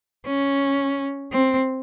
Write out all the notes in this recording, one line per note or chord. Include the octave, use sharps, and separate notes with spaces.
C#4
C4